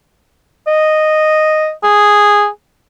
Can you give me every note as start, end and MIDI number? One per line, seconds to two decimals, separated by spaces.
0.67 1.71 75
1.84 2.48 68